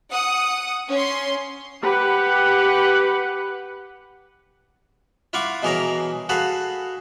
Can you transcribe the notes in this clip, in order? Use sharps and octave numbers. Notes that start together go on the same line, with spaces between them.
F#5 D#6
C#4 C6
G4 B4 F#5
E4 F4 F5 F#5 C#6 D6
B2 E3 G#4 A#4 C#5 A#5
F#4 G#4 A4 B4 F5 F#5